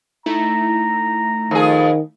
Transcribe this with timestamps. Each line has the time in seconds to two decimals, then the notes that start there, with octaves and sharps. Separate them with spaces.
0.26 A3 D#4 E4 A#5
1.51 F2 D#3 G#4